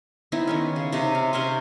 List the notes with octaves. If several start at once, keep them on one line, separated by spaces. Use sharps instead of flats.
B3 C4 D#4 E4
D#3 B3 C#4
C#3
C3 D#4 A5
F5
C3 C#4 A#4 C5